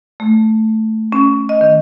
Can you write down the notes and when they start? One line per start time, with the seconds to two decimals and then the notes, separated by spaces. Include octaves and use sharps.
0.20 A3
1.12 C#4
1.49 D#5
1.61 D#3